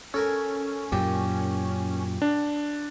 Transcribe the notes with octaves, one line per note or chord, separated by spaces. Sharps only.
C#4 A4 A#4 G#5
F#2 A#2 G4
D4